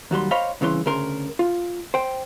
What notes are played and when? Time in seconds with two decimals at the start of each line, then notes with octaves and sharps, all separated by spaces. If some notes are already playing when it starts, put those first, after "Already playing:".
0.11 D#2 F#3 G3 C6
0.31 C5 C#5 D#5 F5 B5 C6
0.61 C2 C#3 E3 C#5 C6
0.86 D2 C#3 A#4 C6
1.39 F4
1.94 C5 G5